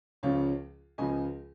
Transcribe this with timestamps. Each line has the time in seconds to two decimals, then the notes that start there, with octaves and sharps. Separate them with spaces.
0.23 C#2 C#3 F3 C#5 F5
0.98 C#2 C#3 F3 D#5 G#5